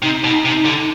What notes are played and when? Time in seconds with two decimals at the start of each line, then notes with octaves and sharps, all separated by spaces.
0.02 C3 D#4
0.24 B2
0.30 D#4
0.45 C3
0.57 D#4
0.66 D3